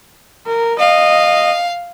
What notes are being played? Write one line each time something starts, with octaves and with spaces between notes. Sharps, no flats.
A#4
D#5 F5